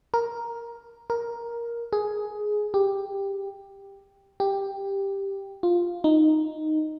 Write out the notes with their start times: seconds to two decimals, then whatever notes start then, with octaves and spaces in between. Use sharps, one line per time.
0.14 A#4
1.10 A#4
1.93 G#4
2.74 G4
4.40 G4
5.63 F4
6.04 D#4